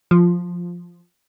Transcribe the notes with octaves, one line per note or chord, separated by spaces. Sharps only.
F3